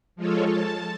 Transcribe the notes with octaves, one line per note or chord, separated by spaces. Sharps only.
F3 G#3 F4 A4 C#5
A5